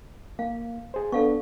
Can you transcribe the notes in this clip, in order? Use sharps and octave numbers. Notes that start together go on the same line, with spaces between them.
A#3 F5
G#4 C5
B3 D4 A4 F5 C#6